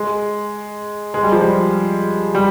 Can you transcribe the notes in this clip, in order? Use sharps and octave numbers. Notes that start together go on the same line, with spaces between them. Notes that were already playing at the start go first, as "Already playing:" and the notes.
Already playing: G#3
G#3
G3
F3
G3
G3